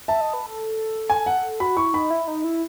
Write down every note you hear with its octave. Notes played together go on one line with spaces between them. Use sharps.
E5 A5
D#5
B4
A4
G#5
F#5
F#4 B5
E4 C#6
D#4 B5
E4
D#4
E4